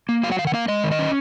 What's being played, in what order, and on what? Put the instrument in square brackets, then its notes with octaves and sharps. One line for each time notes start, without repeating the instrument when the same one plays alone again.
[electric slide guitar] A#3
F#3 F5
F#5
D#3 F5
F#5
A#3 F5
G#3 D#5
D#3
D#5
C#4